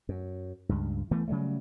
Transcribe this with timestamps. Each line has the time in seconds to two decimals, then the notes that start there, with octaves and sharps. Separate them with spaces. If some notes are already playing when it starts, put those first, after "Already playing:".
0.09 F#2
0.69 C#2 G2
1.11 E3 A3 B3
1.28 C#3 F#3 G3 A3